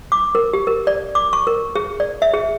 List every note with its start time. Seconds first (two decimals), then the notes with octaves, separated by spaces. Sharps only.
0.12 D6
0.35 A#4
0.53 G4
0.67 A#4
0.87 D5
1.15 D6
1.33 C#6
1.47 A#4
1.75 G#4
2.00 D5
2.22 E5
2.34 G#4